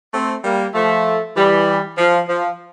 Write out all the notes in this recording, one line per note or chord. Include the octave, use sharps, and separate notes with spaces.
A3 C4
G3 A#3
F3 A3
E3 G3
F3
F3